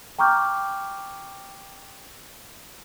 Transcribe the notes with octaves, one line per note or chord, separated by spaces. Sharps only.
G5 A#5 C#6 D6 F6 G6